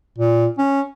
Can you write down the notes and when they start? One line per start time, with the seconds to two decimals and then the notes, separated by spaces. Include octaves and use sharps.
0.18 A#2
0.58 C#4